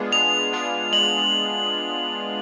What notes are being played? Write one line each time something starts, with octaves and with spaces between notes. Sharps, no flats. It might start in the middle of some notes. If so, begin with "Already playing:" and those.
Already playing: G#3 B3 D4 F4 G#4
G#3 F7
B3 D4 F4 G#4
G#3 F#7